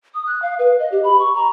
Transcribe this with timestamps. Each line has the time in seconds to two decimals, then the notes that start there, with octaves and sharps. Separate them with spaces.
0.14 D#6
0.27 F#6
0.42 F5
0.59 B4
0.80 D#5
0.92 G4
1.04 B5
1.19 C#6
1.35 A#5